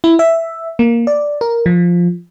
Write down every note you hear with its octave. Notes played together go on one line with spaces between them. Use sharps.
E4
E5
A#3
D5
A#4
F3